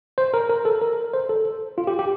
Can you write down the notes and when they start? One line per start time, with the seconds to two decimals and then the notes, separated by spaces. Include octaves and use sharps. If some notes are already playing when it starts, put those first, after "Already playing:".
0.18 C5
0.34 A#4
0.50 A#4
0.65 A4
0.82 A#4
1.14 C5
1.29 A4
1.78 F4
1.87 G4
1.99 G4